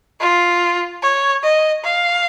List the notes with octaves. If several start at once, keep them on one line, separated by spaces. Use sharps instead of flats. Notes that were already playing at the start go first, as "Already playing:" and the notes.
F4
C#5
D#5
F5